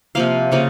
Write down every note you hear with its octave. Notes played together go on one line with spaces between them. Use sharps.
C3 F3 A#3 F5
C#3 F3 A#3